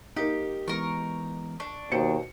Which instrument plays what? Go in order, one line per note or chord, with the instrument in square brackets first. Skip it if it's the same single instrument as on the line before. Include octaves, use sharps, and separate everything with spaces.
[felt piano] A#3 D#4 [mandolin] G4
[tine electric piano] E3 G#3 B3 [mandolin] A#4 C#6
[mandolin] D4 [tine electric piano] C#6
[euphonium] D#2 [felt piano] B2 C5 C#7